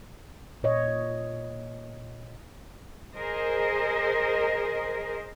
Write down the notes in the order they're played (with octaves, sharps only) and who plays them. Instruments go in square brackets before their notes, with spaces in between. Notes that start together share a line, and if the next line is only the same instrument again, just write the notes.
[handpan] A#2 C#5 D#5
[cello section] G#4 A#4 C5 D#5